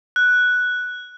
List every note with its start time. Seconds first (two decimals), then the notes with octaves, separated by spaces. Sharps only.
0.16 F#6